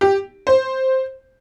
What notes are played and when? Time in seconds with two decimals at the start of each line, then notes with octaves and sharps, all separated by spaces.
0.01 G4
0.47 C5